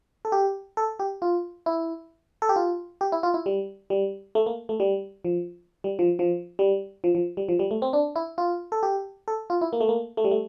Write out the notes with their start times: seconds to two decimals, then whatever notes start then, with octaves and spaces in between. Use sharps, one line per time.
0.25 A4
0.32 G4
0.77 A4
0.99 G4
1.22 F4
1.66 E4
2.42 A4
2.49 G4
2.56 F4
3.01 G4
3.12 E4
3.23 F4
3.34 E4
3.46 G3
3.90 G3
4.35 A3
4.46 A#3
4.69 A3
4.80 G3
5.25 F3
5.84 G3
5.99 F3
6.19 F3
6.59 G3
7.04 F3
7.15 F3
7.37 G3
7.49 F3
7.59 G3
7.71 A3
7.82 C4
7.93 D4
8.16 E4
8.38 F4
8.72 A4
8.83 G4
9.28 A4
9.50 F4
9.61 E4
9.73 A#3
9.81 A3
9.89 A#3
10.17 A3
10.24 G3
10.31 A3